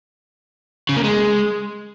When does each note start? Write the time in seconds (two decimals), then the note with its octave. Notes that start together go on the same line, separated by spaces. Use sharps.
0.89 C#3
0.96 A#3
1.04 G#3